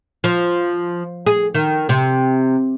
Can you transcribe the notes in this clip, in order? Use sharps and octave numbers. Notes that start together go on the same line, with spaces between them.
F3
G#4
D#3
C3